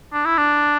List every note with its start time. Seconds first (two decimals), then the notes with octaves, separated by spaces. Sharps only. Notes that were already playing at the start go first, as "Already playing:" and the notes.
0.13 D4
0.25 E4
0.37 D4